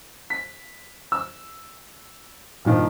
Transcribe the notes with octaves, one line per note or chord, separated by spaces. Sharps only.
B6
E6
G2 A#2 D#3 F3